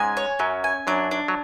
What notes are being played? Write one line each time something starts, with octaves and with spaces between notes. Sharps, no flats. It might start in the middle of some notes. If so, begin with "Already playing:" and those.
Already playing: G#2 G#3 C#4 G#5
C#5
F#2 F#3 C#4
G#5
F#2 F#3 D4
D4
F#3